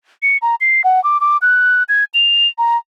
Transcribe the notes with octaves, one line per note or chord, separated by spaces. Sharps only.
C#7
A#5
C7
F#5
D6
D6
F#6
G#6
F7
A#5